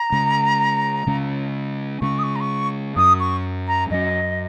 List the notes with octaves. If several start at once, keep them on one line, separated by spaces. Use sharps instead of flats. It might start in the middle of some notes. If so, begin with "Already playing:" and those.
Already playing: A#5
C#3 G#3 C#4
C#3 G#3 C#4
C#3 G#3 C#4 C#6
D#6
C#6
A#5
C#6
F#2 F#3 C#4 D#6
C#6
A#5
F#2 F#3 C#4 D#5